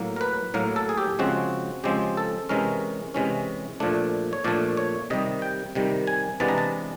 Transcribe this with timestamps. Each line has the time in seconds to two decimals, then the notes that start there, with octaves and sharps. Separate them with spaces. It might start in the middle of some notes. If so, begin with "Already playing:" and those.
Already playing: A2 F#3 A#3
0.16 A#4
0.21 B4
0.54 A2 F#3 A#3 A#4
0.76 A4
0.89 G#4
0.98 G4
1.19 C#3 F3 G#3 C4 F#4
1.84 C#3 F3 G#3 C4 G4
2.17 A4
2.49 C3 E3 G#3 C#4 A#4
3.14 C3 E3 G#3 C#4
3.80 A#2 F3 A3 D4
4.33 C#5
4.44 A#2 F3 A3 D4 D5
4.77 C#5
5.10 C3 D#3 G3 D#5
5.42 G5
5.75 C3 D#3 G3
6.07 G#5
6.40 C3 E3 G#3 B3 D4 A5
6.48 A#5
6.58 A5